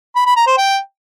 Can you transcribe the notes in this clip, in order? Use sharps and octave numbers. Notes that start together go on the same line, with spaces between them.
B5
B5
A#5
C5
G5